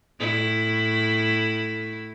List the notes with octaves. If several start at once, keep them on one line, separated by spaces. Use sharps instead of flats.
A2 E4